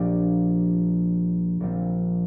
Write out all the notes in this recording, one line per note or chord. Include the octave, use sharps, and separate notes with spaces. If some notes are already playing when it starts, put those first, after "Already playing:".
Already playing: A#1 A#2 F3 D4 G4
A#1 A#2 F3 C4